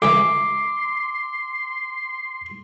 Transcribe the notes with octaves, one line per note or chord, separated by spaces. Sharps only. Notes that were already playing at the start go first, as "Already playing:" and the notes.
C#2 E3 E5 C6 D6